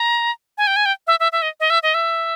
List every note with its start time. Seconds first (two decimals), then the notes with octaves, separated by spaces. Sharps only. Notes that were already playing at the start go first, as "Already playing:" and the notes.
Already playing: A#5
0.58 G#5
0.67 G5
0.76 G#5
0.86 G5
1.07 E5
1.20 E5
1.32 E5
1.42 D#5
1.60 D#5
1.70 E5
1.83 D#5
1.94 E5